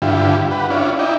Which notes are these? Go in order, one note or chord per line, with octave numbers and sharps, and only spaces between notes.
G2 D3 E4 F4 G4
G4 B4 F#5
C#4 D4 E4 F4
D#4 E4 D5 G5